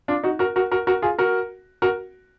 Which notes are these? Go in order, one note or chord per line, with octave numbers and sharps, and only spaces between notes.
D4 F4
D#4 F#4
F#4 A#4
F#4 A#4
F#4 A#4
F#4 A#4
F4 G#4
F#4 A#4
F#4 A#4